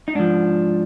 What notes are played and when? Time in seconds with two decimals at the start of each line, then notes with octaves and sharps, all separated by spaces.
0.08 D#4
0.15 G#2 F3 D4